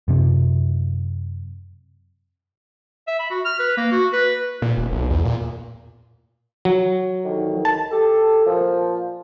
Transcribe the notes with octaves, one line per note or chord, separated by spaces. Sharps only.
F#2 C3
E5
B5
F#4
F6
B4
A#3
F#4
B4
A#2
D#1
B1
E2
A#2
F#3
C2 D3 D#3
A5
G4 A4
A#2 F3